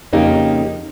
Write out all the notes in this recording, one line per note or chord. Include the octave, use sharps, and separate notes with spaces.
F2 C#3 A#3 D#4 G4